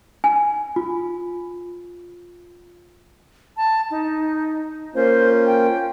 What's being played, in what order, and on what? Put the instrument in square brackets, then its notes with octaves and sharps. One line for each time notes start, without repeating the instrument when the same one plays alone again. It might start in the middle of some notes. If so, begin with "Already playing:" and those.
[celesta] G#5
F4
[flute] A5
D#4
[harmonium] A#3 C#4 F4 [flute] C5
[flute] G5